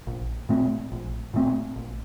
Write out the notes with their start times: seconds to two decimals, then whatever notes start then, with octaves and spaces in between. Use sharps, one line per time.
0.07 A#1
0.49 A#2 A3 C4
0.92 A#1
1.34 A#2 A3 C4
1.76 A#1